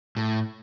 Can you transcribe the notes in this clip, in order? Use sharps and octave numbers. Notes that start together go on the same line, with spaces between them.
A2